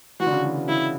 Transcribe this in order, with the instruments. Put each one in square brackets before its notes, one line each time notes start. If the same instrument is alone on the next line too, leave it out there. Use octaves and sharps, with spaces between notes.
[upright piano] E3 [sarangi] F#4
[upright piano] D3
C#3
E3
B2
[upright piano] C#3 [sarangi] E4